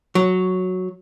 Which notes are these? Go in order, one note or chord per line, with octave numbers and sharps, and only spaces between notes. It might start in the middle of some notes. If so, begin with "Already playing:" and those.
F#3